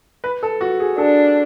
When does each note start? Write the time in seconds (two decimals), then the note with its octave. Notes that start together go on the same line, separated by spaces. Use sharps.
0.24 B4
0.43 A4
0.61 F#4
0.80 G#4
0.98 D4 A4